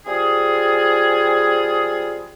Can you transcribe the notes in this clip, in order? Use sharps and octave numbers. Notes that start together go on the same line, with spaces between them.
G3 C4 F4 G#4